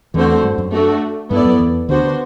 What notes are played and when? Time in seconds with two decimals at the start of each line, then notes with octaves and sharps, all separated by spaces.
0.14 E2 D3 E3 A3 C4 F#4 C5
0.43 G2 G3
0.58 F#2 F#3
0.72 A3 D4 F#4
1.30 G2 G3 B3 E4 A4 D5
1.45 F#2 F#3
1.59 E2 E3
1.89 D2 D3 B3 D4 F#4 C5
2.04 D3